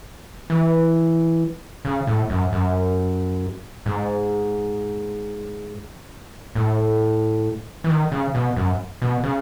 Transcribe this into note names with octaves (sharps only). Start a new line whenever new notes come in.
E3
C#3
A2
F#2
F#2
G#2
A2
E3
D#3
C#3
B2
F#2
B2
C#3